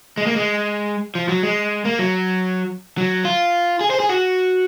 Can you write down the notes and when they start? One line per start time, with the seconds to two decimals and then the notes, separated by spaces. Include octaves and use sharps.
0.18 G#3
0.27 A#3
0.36 G#3
1.15 F3
1.29 F#3
1.43 G#3
1.85 A#3
1.99 F#3
2.98 F#3
3.25 F4
3.81 G#4
3.91 C5
4.00 G#4
4.09 F#4